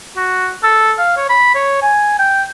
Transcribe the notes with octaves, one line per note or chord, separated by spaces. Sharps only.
F#4
A4
F5
C#5
B5
C#5
G#5
G5